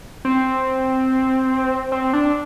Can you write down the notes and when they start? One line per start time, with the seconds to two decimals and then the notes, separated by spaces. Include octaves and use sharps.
0.25 C4
1.92 C4
2.13 D4